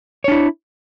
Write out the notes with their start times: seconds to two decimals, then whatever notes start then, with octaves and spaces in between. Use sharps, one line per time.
0.24 C#5
0.28 D4
0.32 E4